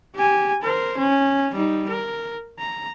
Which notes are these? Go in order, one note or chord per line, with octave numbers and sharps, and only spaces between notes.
G4 G#5
A#4 C5
C#4
G3 D#4
A#4
A#5